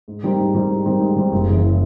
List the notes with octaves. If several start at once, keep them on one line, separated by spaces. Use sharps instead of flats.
G#2
D#3 G3 C4 D#4
G#2
D#3 G3 C4 D#4
G#2
D#3 G3 C4 D#4
G#2
D#3 G3 C4 D#4
F#1
F#2 C#3 E3